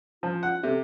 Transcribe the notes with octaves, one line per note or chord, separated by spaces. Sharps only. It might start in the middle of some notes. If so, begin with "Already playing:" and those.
F3 F4
F#5
C3 A4